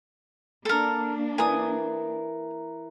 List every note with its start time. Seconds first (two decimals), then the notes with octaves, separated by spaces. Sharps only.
0.65 A#3 D4 A4 A#4
1.38 E3 A#4 G#5 D#6